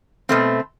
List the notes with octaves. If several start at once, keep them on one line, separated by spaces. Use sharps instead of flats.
B2 A3 C4